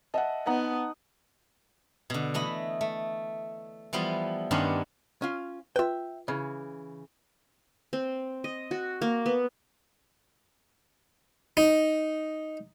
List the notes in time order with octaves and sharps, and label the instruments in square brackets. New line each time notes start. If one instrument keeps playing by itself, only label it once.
[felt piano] D#5 E5 F#5 [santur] A5
[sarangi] B3 [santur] D#4 [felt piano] F#5
[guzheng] B2 D3
E3 A3 D#5 B5
A3
E3 F3 G3 B3
G2 D#3 B3 C#4 D4 C5
[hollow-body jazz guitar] C#4 F4
[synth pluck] F4 B4 [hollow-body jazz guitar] E5 G5
[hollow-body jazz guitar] C#3 E3
[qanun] C4
D#5
F#4
A#3
B3
[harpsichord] D#4